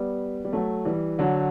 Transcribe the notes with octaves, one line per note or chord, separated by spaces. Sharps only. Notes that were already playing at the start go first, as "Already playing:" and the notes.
Already playing: G3 B3
G3
F#3 A3
E3 G3
D3 F#3